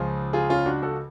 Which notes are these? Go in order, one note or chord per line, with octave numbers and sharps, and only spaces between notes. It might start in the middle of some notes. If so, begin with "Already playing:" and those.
Already playing: C#2 C#3 F3 F4 G#4
F4 G#4
C#4 F4
D4 F#4
F#4 A4